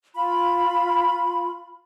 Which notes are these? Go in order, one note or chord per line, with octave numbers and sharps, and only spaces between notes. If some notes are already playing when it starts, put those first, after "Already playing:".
F4 B5